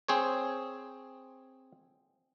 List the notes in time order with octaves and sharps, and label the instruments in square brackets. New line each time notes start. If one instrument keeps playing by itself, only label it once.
[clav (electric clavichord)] C4 G#4 C5 C#5